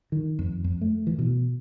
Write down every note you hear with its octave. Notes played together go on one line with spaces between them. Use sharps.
D#3
F2
F2
A3
E3
B2